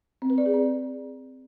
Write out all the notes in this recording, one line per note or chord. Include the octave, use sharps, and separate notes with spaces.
C4
B4
D5
G#4
C4